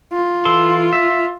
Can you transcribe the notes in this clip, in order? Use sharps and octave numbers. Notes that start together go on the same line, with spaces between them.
F4
E3 A4 C6
E5